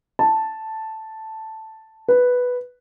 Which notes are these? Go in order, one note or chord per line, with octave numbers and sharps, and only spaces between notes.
A5
B4